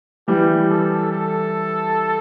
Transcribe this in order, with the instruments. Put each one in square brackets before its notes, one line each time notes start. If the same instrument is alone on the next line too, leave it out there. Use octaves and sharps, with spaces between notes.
[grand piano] E3 G3 [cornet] G4
[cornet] A4
A4